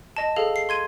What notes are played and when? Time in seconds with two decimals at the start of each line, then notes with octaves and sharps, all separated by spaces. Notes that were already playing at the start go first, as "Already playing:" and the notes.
0.17 D#5 A5
0.36 G#4 A4 F5
0.56 C7
0.69 C6 G#6 D#7